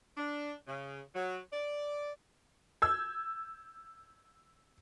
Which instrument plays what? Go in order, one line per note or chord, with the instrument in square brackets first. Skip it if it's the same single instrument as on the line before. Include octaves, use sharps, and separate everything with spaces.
[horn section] D4
C#3
F#3
D5
[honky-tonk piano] E6 G6 G#6